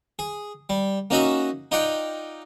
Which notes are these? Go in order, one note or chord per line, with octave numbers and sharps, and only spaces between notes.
G#4
G3
A#3 C#4 D#4 F#4 D#5 E5
D#4 F4 D5 F#5 G5